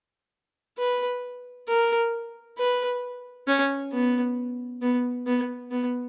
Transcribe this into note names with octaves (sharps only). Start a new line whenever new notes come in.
B4
A#4
B4
C#4
B3
B3
B3
B3